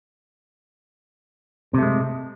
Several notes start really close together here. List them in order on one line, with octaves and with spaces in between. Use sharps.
C3 A3 G#3